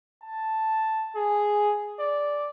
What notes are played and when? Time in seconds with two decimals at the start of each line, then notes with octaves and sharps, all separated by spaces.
0.23 A5
1.16 G#4
2.00 D5